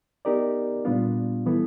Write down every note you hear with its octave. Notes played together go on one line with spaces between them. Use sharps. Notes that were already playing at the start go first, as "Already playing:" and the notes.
B3 D#4 G4 A#4 D5
A#2 G3 B3 D4 F4
E3 G3 B3 E4 A4